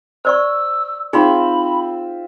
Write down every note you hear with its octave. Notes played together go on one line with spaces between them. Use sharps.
C5 D5 C#6 E6
C4 D#4 F4 G#4 E5 B5